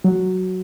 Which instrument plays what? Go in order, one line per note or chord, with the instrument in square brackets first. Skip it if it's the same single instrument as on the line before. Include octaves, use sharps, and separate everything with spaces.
[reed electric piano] F#3